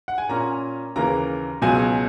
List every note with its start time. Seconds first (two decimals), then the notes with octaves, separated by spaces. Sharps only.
0.08 F#5
0.18 G#5
0.29 A#2 A#3 C#4 A#5
0.96 D#2 C#3 E3 A#3 A#5
1.62 C#2 B2 F#3 G#5